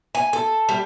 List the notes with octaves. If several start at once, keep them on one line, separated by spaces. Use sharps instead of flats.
G#5
A4
G3